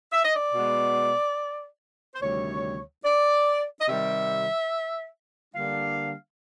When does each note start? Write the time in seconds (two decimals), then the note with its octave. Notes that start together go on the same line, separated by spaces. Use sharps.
0.13 E5
0.24 D#5
0.34 D5
0.54 B2 G#3 B3
2.15 C5
2.21 D2 C3 D#3 G3 C#5
3.05 D5
3.80 D#5
3.87 C3 D#3 G3 E5
5.55 D3 G3 A#3 D4 F5